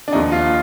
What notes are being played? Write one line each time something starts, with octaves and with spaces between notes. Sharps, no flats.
D4
D#2 D3 F3 D#4
F4